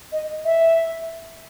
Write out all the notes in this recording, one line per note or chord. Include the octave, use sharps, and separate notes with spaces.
D#5
E5